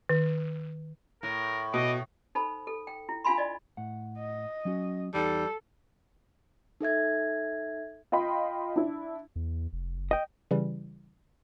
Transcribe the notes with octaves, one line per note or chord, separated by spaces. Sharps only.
D#3
A2 A#4
B2 D#5 D6
D#4 A4 C5 B5
A4
G5
E4
D4 F4 F5 G#5 B5 C6
D5 D#5
A2 F#5
D#5
F#3 C#4 F#4
E2 G3 D#4 A4
D#4 A4 E5 G#6
F4 D#5 G5 B5 C6
D4 E4
E2
F1
F#1
D#5 G5
C#3 E3 G3